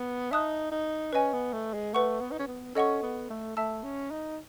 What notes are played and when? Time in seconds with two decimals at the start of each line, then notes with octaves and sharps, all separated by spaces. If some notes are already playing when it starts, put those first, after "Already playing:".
Already playing: B3
0.31 D#4 E5 A5 D#6 F#6
0.72 D#4
1.13 C#4 B4 D#5 G#5
1.33 B3
1.53 A3
1.74 G#3
1.94 A3 B4 F#5 C#6
2.21 B3
2.31 D#4
2.39 C#4
2.48 B3
2.75 C#4 A4 D#5 F#5 C#6
3.03 B3
3.30 A3
3.57 A3 E5 A5 E6
3.83 C#4
4.11 D#4